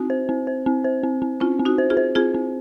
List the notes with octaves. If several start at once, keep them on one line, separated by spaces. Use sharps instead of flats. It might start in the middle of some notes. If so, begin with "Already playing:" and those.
Already playing: C4 D#4 F#4
C5
C4
C5
C4
C5
C4
C4
C4 C#4 F4
C4
D#4 F#4
C5
F4 G#4
C5
C4 F4 G#4
C4